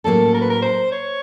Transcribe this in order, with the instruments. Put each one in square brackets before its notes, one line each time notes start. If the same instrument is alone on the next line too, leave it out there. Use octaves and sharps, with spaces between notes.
[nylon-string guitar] A2 F#3 A#3 C#4 [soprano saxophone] A4
[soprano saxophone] A#4
B4
A#4
C5
C#5